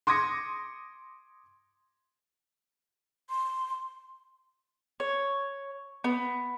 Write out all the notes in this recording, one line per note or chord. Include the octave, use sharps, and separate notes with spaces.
C6 D6 D#6 G#6 A#6 C#7
C6
C#5
B3